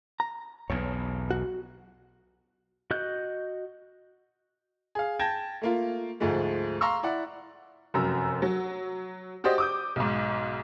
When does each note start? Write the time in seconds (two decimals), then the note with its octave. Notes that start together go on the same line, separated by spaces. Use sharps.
0.20 A#5
0.70 B1 E2 C#5
1.30 F#4
2.91 F#4 D#5 F#6 G6
4.95 G#4 F5
5.19 G5 A5 G6 G#6 A#6
5.62 A3 A#3 F4
6.20 D2 G#2 F3 G#3 A3
6.81 F5 A#5 C6 C#6 E6
7.03 E4 D5 F#5
7.94 F1 F#2 F#3 A#5 E6
8.42 F#3
9.44 F#4 G4 C5 D5 D#5
9.58 D6 D#6 G6
9.96 B1 G#2